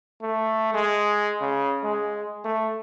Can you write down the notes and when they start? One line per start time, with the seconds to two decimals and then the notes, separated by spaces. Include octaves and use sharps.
0.22 A3
0.74 G#3
1.41 C#3
1.84 G#3
2.45 A3